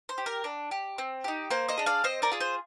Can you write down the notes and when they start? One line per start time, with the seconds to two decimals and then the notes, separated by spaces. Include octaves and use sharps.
0.09 C5
0.18 G4
0.26 A#4
0.44 D4
0.71 G4
0.98 C4
1.24 D#4 G4
1.50 A#3 C5
1.68 C5 D#5
1.78 D4 G#4
1.86 D5 F5
2.04 C4 C5 D#5
2.22 A#4 D5
2.32 F4 G#4
2.40 C5